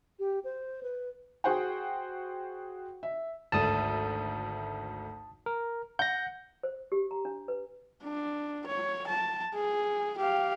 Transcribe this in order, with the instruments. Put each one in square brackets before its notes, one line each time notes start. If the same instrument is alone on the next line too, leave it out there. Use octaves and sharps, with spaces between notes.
[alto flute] G4
C5
B4
[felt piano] F#4 G#4 C5 F#5 G5
E5
[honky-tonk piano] G#1 D2 A3 [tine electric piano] A5 D#6
[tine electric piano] A#4
[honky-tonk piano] F#5 [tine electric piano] G6 A#6
[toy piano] C5
G4
A#5
D4
B4
[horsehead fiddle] D4
C#5
A5
G#4
G4 F5